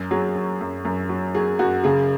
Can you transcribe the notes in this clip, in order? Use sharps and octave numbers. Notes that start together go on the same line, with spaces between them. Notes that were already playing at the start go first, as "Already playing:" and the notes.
Already playing: F#2
F#3 G#4
F#3
F#2
F#2
F#3
F#3 G#4
F#2 F#4
C#3 G#4